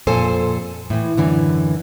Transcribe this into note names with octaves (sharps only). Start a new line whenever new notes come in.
F2 A#2 A4 C5 G#5
A2 E3
F#2 D3 E3